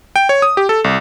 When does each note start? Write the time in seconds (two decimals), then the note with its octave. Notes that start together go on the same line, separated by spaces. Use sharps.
0.16 G5
0.29 C#5
0.42 D#6
0.57 G4
0.69 A4
0.84 C2